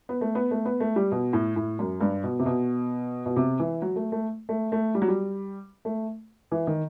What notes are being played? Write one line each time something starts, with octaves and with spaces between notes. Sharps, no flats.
B3
A3
B3
A3
B3
A3
G3
B2
A2
A2
F#2
G2
B2
C3
B2
B2
C3
E3
F#3
A3
A3
A3
A3
G3
F#3
G3
A3
E3
D#3